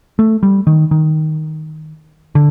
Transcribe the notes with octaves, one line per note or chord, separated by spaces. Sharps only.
A3
G3
D#3
D#3
D3